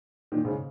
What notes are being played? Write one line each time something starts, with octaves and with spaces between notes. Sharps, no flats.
A#2 D#3
G#2 C#3